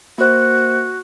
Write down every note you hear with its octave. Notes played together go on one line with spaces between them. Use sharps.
A#3 F#4 C5